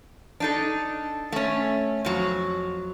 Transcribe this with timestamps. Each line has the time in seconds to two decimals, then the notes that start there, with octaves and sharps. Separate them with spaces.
0.40 D4 D#4 A4
1.32 A3 C#4
2.05 F2 F#3